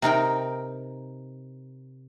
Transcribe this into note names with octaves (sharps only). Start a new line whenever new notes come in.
C3 D#4 A#4 G5